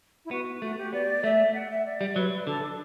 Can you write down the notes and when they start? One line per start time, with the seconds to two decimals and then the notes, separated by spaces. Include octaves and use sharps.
0.25 E4
0.31 B3 F#4
0.62 A3 F#4
0.77 G4
0.93 B3 D5
1.24 A3 E5
1.54 F#5
1.70 E5
1.85 D5
2.01 G3
2.16 F#3 B4
2.31 B4
2.46 D3 A4
2.62 D4